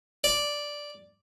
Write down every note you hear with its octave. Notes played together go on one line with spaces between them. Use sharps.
D5